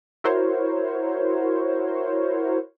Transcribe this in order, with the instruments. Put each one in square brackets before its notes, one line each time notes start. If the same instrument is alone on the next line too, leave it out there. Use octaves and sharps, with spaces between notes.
[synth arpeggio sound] E4 F#4 A#4 C5 C#5